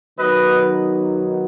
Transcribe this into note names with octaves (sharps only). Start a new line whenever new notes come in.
D#3 F#3 B3 D#4 B4 D#5